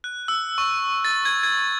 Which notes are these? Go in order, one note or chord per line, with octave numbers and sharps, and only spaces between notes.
F#6
E6
C#6
A6
G#6
G#6